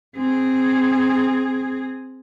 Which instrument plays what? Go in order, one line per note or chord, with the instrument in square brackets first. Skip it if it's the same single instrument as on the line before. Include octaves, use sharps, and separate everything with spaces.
[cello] C4 G#4